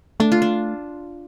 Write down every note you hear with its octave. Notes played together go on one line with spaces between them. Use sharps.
A3 D4
F4
D4